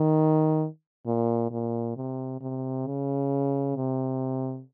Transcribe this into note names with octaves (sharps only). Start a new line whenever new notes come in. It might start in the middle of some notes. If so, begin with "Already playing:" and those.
Already playing: D#3
A#2
A#2
C3
C3
C#3
C3